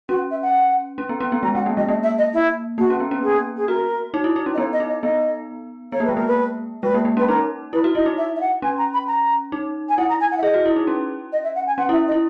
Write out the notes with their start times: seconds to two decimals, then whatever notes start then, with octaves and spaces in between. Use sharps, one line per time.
0.09 C#4 F#4
0.31 E5
0.42 F#5
0.98 C#4
1.09 B3
1.20 C#4
1.32 B3
1.43 G#3 A#5
1.55 G#3 F#5
1.66 A#3
1.77 G#3 D#5
1.88 A#3 D#5
2.03 E5
2.18 D#5
2.33 E4
2.78 A#3 F#4
2.90 C#4
3.00 B3
3.11 C#4
3.23 G#4
3.57 G#4
3.68 F#4 A#4
4.14 D#4
4.24 E4
4.36 D#4
4.46 C#4
4.54 D#5
4.58 B3 C#5
4.73 D#5
4.80 D#4
4.88 D#5
5.03 B3 D#5
5.92 B3 C#5
6.00 A#3
6.05 G#3 B4
6.16 A#3 A#4
6.27 B4
6.83 G#3 B4
6.95 A#3
7.05 A#3
7.17 C#4 B4
7.28 D#4 A#4
7.73 E4 B4
7.84 F#4
7.95 E4 D#5
8.06 D#4
8.18 E5
8.36 E5
8.41 F#5
8.62 C#4 G#5
8.78 A#5
8.93 B5
9.07 A#5
9.52 D#4
9.89 G#5
9.98 E4 F#5
10.09 A#5
10.20 G#5
10.31 F#5
10.38 E5
10.43 G#4 D#5
10.54 F#4
10.66 E4
10.76 D#4
10.87 C#4
11.32 D#5
11.44 E5
11.55 F#5
11.67 G#5
11.78 C#4 F#5
11.89 E4 E5
12.08 D#5
12.12 E4